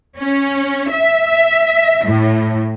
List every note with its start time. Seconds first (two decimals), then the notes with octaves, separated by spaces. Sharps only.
0.17 C#4
0.92 E5
2.06 A2